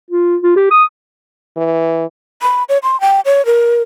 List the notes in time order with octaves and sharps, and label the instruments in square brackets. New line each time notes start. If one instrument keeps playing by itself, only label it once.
[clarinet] F4
F4
G4
D#6
[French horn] E3
[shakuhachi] B5
C#5
C6
G5
C#5
A#4